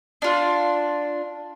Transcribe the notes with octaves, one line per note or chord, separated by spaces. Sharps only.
D4 F4